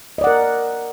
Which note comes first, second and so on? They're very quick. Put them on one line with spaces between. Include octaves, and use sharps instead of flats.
D#5 D5 F#5 A#4